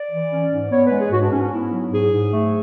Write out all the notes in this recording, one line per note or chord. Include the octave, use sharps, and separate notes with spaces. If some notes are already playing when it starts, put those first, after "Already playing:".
Already playing: D5
E3
C#4
G#2
B3 C#5
B4
G#3
G#4
G#2 F#4
D4
G#2 C#4
C#4
B3 E4
F#3
G#2 G#4
G#2
A3